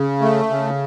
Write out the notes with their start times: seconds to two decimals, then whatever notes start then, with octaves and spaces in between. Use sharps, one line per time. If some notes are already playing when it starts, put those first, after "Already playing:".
Already playing: C#3
0.21 A3
0.50 C#3